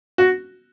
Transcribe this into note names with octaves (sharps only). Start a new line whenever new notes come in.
F#4